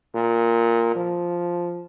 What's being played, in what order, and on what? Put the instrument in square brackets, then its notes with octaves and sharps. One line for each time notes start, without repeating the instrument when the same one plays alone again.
[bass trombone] A#2
F3